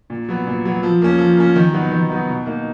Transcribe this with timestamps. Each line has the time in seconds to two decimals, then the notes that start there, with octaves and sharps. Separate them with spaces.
0.10 A#2
0.29 F#3 B3
0.47 A#2
0.65 F#3 B3
0.83 F3
1.02 A#3 C#4
1.19 F3
1.37 A#3 C#4
1.56 D#3
1.73 F#3 B3 D#4
1.91 D#3
2.10 F#3 B3 D#4
2.28 B2
2.46 A#3 D#4